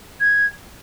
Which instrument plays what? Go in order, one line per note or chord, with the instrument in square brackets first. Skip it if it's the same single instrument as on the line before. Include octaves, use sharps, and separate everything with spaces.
[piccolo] G#6